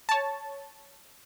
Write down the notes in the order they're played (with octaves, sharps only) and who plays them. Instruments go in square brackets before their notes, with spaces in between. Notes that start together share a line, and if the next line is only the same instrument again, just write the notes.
[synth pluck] C#5 A5